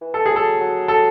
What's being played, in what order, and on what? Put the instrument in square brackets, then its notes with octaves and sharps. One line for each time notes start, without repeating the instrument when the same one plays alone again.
[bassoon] E3
[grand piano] A4
G#4
[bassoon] F#3
[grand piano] A4
[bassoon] F#3
[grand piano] A4